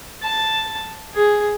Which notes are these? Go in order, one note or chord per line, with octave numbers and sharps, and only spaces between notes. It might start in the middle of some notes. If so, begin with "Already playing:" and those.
A5
G#4